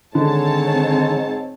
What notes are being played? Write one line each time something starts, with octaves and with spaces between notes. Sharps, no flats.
G#2 D3 D#3 C4 C#5 A5